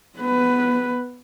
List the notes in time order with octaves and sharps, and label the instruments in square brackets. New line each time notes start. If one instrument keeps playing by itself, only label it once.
[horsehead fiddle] B3 B4